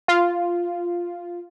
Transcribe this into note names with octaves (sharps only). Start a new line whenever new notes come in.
F4